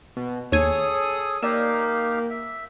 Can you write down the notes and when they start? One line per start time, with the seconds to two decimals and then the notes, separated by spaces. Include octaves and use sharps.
0.17 B2
0.52 D#2 G#4 A4 C#5 G#5 D#6
1.43 A#3 D#4 G4 D5 F5 E6
2.30 E5